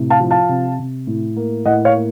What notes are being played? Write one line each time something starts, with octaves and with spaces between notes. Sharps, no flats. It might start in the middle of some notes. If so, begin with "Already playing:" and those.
Already playing: A2 C3
F5 A5
F3
F5 A5
C3
C3
A2
A#3
A2 D#5 F#5
C#5 F5
A#3